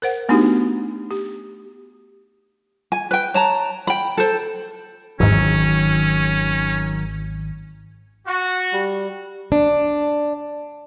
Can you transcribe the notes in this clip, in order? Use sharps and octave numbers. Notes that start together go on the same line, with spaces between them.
A#4 C5 F#5
A3 B3 D4 D#4 F#4 G4
G4
G#5
B4 G5
C#5 A5 A#5
G5 B5
A4 C5
G#1 E2 G#2 D#3 F#3 C#4
F#4
G3
D4